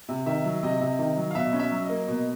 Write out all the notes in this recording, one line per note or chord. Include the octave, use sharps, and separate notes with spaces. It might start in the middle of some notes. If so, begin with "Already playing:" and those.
C3
D#3 E5
F#3
C3 D#5
C3
D#3
F#3
F5
B2 E5
C#4
E5
F#3
D#5
A#3
B2